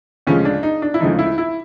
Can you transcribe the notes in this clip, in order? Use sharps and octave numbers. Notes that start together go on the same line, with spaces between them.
D2 C#3 F3 G#3 C#4
D4
D#4
D4
E4
D2 C#3 F3 G#3 D#4
E4
E4